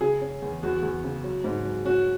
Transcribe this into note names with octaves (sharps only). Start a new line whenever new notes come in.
C#3 G#4
C#4
E2
E2 F#4
E2
C#3
F#3
G#2
F#3
C#4 F#4